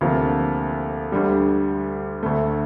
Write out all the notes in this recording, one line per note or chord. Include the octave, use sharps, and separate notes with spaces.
D2 C3 F3 A#3 F4
D2 D3 G3
D2 D3 A3